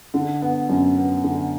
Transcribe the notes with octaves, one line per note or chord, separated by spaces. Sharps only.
D3
B3
F#2
B3
D3